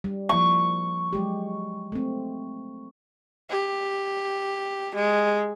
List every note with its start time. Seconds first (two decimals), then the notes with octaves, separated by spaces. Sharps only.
0.04 G3
0.29 F3 A#3 E4 C#6
1.13 F#3 G#3 G4
1.92 A3 C4
3.50 G4
4.95 G#3